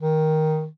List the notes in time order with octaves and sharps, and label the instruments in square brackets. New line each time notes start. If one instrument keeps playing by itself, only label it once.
[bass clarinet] D#3